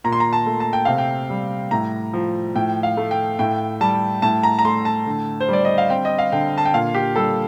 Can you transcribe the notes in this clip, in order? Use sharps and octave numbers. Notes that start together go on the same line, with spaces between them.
A#2 A#5
C6
A#5
A5
A3
A5
G5
C3 F5
G5
G3
A2 A#5
F3
A2 G5
F5
A3
G5
A2 G5
G3 A5
A2 A5
A#5
A#5
A3 C6
A5
D3
C5
G3 D5
D#5
F5
C4 G5
D#5
F5
D3 G5
A5
G5
A#2 F5
G4
G3 A4